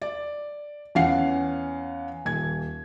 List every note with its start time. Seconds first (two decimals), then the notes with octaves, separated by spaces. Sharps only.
0.02 D5
0.95 E2 C#4 F5 F#5 C7
2.26 D#1 G#6